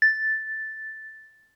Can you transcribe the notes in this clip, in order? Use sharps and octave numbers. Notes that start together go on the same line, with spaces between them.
A6